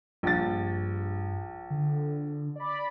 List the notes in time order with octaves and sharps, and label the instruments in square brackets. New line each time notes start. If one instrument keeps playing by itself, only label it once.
[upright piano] A#1 A6 [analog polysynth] G2
[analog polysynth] D3
D5 B5